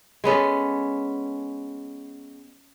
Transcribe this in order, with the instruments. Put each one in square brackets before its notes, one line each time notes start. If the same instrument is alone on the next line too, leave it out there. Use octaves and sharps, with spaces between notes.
[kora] G#3 B3 C#4 A4